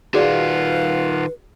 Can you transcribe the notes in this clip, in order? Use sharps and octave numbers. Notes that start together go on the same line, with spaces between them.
D#3 F4 F#4 G#4 B4 D5 F5 F#5